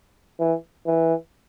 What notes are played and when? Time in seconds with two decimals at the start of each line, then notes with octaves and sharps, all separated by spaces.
0.40 E3
0.86 E3